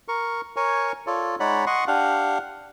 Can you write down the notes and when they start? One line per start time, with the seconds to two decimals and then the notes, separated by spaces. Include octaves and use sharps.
0.08 A#4 C#6
0.56 A#4 C#5 G#5 C#6
1.07 F4 A4 C#5 D5
1.40 G#3 D#4 C#5 D5 F#5 B5
1.66 D#5 F#5 C6 C#6
1.88 D4 G4 F5 F#5